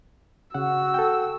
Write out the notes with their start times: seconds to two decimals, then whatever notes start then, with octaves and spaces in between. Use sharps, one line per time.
0.54 C#3 F#4 F#5 E6
0.94 A4 G5